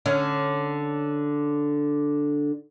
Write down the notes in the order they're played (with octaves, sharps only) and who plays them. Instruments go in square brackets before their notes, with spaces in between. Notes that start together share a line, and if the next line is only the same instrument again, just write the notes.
[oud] D3 C#4